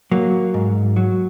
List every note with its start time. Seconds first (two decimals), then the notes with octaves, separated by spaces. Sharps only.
0.12 F#3 A#3
0.54 G#2
0.96 F#3